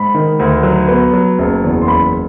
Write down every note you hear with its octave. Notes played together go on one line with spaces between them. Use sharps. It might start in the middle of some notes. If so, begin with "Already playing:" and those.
Already playing: G#2 B5
D#3
D2
F#3
B3
F#3
F#1
E2
C6
F#1 B5